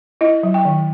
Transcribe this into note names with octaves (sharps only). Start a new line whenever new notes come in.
E4 D#5
F#3
G5
D#3